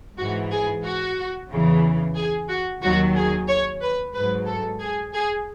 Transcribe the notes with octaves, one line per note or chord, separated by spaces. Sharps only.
G#2 E3 F#4
G#4
F#4
E2 C#3 E3
G#4
F#4
D#2 D#3 F#3 F#4
G#4
C#5
B4
G#2 B4
F#3
A4
G#4
G#4